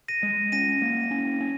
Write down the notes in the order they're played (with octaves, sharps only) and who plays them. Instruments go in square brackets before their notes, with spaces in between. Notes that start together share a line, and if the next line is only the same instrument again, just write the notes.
[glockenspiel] A#6 D#7
[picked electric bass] G#3
[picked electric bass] C#4 [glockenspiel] A#6 D#7
[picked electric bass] A#3
C#4
C#4